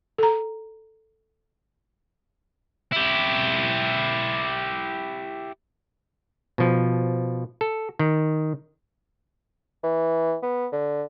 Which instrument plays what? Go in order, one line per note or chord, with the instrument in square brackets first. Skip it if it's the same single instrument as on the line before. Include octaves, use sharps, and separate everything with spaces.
[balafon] A4 A#5
[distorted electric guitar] E4 G4
[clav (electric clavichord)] B2 F3
A4
D#3
[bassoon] E3
B3
D3